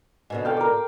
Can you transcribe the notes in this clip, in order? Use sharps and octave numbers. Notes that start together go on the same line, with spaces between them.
G#2 B2 D3
A4 F5 G5
A#4 D6